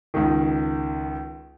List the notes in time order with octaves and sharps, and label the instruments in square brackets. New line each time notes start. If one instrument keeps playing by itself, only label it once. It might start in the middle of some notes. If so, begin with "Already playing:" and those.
[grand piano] C#2 D#3